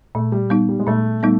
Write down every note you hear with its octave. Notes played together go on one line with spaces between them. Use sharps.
A#2 A3
G3
G3 B3 D#4
G3
G#3
A#2 A3
G3 A3 B3 D#4